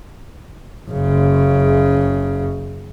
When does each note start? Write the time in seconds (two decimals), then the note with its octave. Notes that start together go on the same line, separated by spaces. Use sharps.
0.90 F#1 C#3